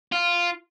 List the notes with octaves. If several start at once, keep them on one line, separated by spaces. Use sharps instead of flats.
F4